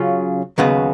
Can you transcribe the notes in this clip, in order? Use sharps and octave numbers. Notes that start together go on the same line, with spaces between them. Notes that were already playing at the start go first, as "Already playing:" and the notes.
Already playing: C#3 F#3 C#4 F4
D#2 C#3 F#3 B3